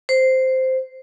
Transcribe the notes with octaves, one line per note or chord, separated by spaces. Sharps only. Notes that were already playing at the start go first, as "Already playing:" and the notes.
C5